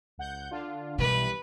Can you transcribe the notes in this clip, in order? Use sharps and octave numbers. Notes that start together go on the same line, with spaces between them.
C#2 F#5 G6
D3 D4 F4
B1 B2 E3 G3 B4